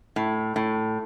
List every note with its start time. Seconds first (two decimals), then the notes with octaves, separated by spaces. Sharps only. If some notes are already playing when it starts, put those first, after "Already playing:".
0.16 A2
0.56 A2